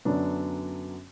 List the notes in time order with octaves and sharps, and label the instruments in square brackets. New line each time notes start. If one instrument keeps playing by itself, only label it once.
[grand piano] F#2 D3 F#3 B3 D4